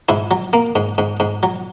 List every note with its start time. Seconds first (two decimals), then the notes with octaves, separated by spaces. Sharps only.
0.09 G#2 E4
0.31 F#3
0.53 A#3
0.76 G#2
0.98 G#2
1.20 G#2
1.43 F#3